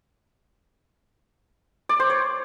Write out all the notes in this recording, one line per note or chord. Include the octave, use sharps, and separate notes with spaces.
D5
C5
C#5